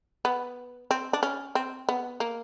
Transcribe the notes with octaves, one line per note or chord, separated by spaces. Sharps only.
B3
C4
D4
C#4
C4
B3
A#3